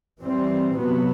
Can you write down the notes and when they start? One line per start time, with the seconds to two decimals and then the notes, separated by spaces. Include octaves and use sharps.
0.21 E3 G3 C4
0.77 C3 F#3 B3